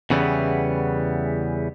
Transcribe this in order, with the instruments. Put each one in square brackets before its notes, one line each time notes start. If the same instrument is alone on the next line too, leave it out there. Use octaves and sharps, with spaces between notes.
[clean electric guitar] E2 C#3 E3 G3 B3